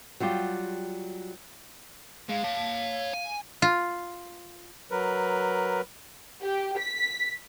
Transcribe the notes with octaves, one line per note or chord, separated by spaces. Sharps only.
F#3 G3 F4 G4
G#2 G#3 F5
C#5 A5
G#5
F4
F#3 A#4 B4
G4
B6